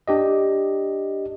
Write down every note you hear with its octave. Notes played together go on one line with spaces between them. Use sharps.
D4 G4 D#5